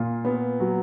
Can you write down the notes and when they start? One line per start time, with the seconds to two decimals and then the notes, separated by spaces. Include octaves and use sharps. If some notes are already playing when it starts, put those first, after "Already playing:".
Already playing: A#2 F4
0.25 B3
0.60 F#3